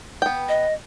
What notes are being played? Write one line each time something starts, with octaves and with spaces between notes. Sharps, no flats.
B3 G5
D#5